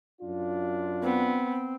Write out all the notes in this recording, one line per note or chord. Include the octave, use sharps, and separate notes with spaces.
F#2 D4 F4
B3 C4